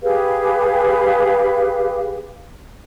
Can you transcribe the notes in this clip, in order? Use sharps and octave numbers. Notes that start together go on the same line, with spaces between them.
G4 G#4 B4 F5